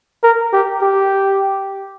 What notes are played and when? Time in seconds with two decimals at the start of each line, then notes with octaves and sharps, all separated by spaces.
0.23 A#4
0.53 G4
0.82 G4